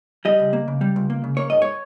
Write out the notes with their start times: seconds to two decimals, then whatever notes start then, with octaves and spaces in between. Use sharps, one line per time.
0.25 G3 D#5
0.40 C#2
0.53 A#3
0.68 C#3
0.81 G3
0.96 C#2
1.10 A#3
1.24 C#3
1.37 A#3 C#5
1.50 G#2 D#5
1.62 C#5